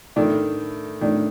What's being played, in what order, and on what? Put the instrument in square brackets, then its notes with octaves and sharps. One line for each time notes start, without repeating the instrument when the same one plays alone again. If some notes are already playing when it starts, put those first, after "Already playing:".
[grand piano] A2 A3 D4 A4 D5 [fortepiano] D#3
[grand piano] A2 A3 D4 A4 D5 [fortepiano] D#3